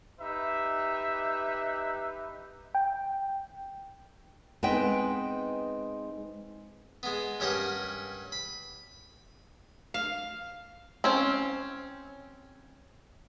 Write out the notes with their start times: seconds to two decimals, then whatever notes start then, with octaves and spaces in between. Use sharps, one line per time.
0.20 D#4 G4 B4 E5
2.75 G5
4.63 G#3 B3 C4 D#4 B4 G5
7.03 G#3 B3
7.40 G2 C#4 G4 A#4 F#5
8.32 B5
9.94 F5
11.04 C4 C#4